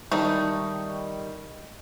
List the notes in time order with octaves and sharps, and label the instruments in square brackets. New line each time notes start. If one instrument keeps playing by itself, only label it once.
[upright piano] D#3 G3 C#6 [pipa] A3 D#4